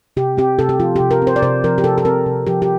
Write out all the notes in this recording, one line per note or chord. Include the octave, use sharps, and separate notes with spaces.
C3 G4
C4 G4
C3 A4
G4
F3 F4
C3 G4
A#4
C4
C5
D5
C3 C5
F3 A#4
G4
C3 A4
A4
C4 A#4
C3
F3 G4
G4